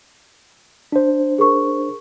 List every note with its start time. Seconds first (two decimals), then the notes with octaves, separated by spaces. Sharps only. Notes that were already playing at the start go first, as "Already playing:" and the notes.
0.92 D4 C5
1.38 G#4 A#4 C#6